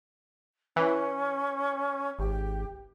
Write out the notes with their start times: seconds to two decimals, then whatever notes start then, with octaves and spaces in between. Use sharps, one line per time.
0.76 E3 C#4
2.19 G#1 G4